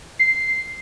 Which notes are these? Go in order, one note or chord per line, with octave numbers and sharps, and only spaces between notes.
C7